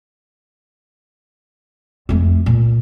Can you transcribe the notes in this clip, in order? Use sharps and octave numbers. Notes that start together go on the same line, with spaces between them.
F2 A3
A#2